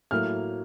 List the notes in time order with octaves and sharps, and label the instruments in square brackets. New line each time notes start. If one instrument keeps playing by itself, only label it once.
[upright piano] A2 F#3 A#3 F6